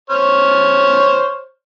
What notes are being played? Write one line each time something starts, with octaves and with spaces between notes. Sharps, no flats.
C5 C#5 F6